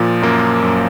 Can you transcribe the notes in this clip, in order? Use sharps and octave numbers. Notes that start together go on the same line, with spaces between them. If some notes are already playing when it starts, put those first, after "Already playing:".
Already playing: A#2 F3
F#2 A#3
F#2